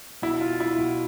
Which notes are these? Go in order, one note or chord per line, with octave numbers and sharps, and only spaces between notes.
B2 E4
F4
E4
B2